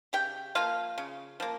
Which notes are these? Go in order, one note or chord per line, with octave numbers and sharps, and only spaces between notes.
C#3 G4 G5
F3 A#3 F4 F5
C#3
F3 A#3